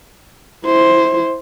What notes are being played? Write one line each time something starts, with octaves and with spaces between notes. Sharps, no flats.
E4 C5